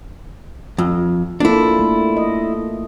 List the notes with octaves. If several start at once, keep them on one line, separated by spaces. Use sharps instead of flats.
F2
A#3 D4 E4 F4 A4
A3
D#5